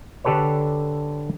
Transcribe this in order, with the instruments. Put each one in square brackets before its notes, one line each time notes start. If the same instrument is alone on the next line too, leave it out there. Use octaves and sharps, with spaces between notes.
[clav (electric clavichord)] D3 D4 G4 A4 B4 C#5